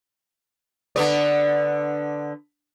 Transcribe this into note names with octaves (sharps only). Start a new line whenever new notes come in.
D3 B3 D5